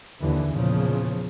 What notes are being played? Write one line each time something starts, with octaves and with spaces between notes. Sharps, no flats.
D#2 D3 E3
E2 A#2 C#3 F3